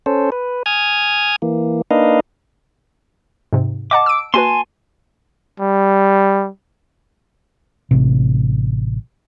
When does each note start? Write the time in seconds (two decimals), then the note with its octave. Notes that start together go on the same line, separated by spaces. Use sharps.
0.06 C#4 A4 C5
0.32 B4
0.66 G#5 D#6 F6 G#6
1.42 E3 A#3
1.91 A#3 D4 D#4 B4 D#5 F5
3.53 G#2 C3
3.91 D#5 F#5 A5 D6
4.06 E6 D7
4.34 A#3 F#4 B4 G#5 A5 C6
5.60 G3
7.91 A1 C3